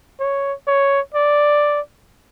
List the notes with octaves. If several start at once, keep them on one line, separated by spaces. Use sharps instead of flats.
C#5
C#5
D5